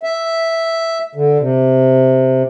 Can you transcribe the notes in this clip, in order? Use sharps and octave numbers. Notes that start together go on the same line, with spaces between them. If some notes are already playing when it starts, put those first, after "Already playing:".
E5
D3
C3